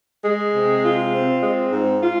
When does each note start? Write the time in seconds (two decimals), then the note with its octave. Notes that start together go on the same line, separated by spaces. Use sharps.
0.23 G#3
0.53 C3
0.82 F4
1.12 C4
1.41 G#3
1.71 G#2
2.01 F4